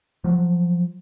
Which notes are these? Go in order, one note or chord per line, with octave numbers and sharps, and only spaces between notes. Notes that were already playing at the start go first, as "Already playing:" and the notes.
F3 F#3